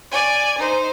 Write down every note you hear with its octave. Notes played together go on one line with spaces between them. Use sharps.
D5 G#5
D#4 C5